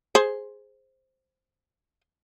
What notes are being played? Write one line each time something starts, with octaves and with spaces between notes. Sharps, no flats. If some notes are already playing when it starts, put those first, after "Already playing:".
G#4 C5